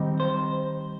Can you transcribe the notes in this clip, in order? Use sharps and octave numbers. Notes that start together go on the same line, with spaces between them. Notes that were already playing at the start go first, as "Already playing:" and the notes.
Already playing: D#3 G3 C4 D#4
C5